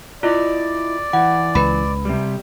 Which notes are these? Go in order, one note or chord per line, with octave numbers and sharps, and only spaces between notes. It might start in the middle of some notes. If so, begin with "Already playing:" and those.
E4 F4 D5 D#5
E3 F#5
C#2 B4 B5
C3 G3